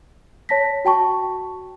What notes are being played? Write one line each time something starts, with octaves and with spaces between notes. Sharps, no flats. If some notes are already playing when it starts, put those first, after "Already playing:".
C#5 A5 A#6 B6
F#4 G5 A5 C#6